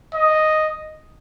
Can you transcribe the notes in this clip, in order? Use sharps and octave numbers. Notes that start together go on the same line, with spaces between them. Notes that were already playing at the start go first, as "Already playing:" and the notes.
D#5